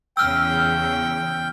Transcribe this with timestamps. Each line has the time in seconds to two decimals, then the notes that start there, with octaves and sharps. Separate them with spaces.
0.17 E2 C#3 G5 E6 F6